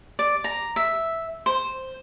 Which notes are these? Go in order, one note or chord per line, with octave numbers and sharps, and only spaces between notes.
D5
A#5
E5
C5